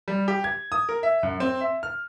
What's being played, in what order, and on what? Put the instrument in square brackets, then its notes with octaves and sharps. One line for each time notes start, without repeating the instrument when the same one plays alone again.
[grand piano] G3
G4
G#6
D#6
A#4
E5
F#2
C4
E5
F6